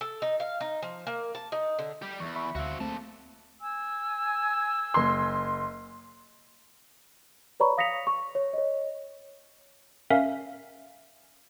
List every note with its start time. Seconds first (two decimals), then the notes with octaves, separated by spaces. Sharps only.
0.01 A4
0.22 D#4
0.40 F5
0.61 D#4
0.83 F3
1.07 A#3
1.35 A5
1.52 D#4
1.79 D3
2.02 G3 G4
2.20 E2 C#6
2.36 E5 B5 C#6
2.55 D2 C4 F#4 E5 F5
2.80 A3 A#3 C4 A5
3.60 G#5 E6
4.94 F#1 C6
7.60 B4 C#5 D5 A#5 B5 C#6
7.77 F5 D#6 A#6 B6 C#7 F7
8.07 C#6
8.35 C#5
8.53 C#5 D#5
10.10 C#4 A#4 E5 F5 B6